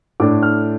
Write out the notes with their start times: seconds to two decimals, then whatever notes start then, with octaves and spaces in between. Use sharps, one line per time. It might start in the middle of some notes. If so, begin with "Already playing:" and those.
0.20 A2 A3 D4 D6
0.43 F6